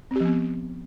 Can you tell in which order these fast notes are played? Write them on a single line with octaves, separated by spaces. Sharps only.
C4 G4 F3 B3